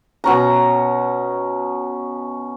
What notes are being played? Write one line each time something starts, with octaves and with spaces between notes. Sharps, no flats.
B2 C#4 A#5